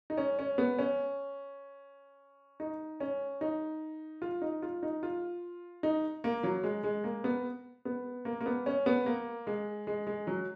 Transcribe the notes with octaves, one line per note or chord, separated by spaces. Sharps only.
D#4
C#4
C#4
B3
C#4
D#4
C#4
D#4
F4
D#4
F4
D#4
F4
D#4
A#3
F#3
G#3
G#3
A#3
B3
B3
A#3
A#3
B3
C#4
B3
A#3
G#3
G#3
G#3
F#3